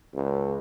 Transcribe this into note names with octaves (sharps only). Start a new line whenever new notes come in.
C#2